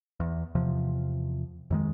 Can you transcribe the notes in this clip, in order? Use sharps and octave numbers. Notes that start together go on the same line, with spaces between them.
E2
E2 C3 F3
F2 D#3 G#3